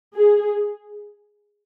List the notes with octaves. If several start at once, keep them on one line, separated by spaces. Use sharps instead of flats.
G#4